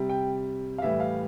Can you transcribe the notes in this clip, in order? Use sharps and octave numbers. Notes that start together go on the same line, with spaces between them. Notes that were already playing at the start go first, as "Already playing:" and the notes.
Already playing: C3 G3
G5
F5
A2 E3 G3 E5
F5